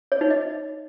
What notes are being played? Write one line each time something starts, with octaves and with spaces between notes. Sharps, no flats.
C#5
D#4
D#5